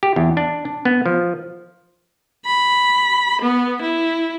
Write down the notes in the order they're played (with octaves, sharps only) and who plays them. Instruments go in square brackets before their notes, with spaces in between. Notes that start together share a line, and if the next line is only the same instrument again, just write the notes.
[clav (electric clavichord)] G4
E2
D4
D4
B3
F3
[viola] B5
B3
E4